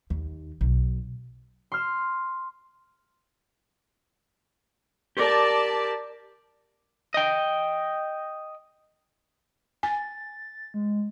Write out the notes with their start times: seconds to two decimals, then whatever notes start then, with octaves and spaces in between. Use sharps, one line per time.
0.10 D#2
0.61 B1
1.72 C6 F6 E7
5.17 G4 A#4 D5 A5
7.14 D#5 G5
9.83 G#5 A6
10.74 G#3